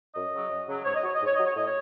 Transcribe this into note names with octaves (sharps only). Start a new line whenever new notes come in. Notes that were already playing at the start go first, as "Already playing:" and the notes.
F#2 D#5
C#3 F#3
F#2
C#3 F#3
G#2 C#5
D#5
F#3 C#5
G#2 D#5
C#5
F#3 D#5
C#5
A2 D#5
C#5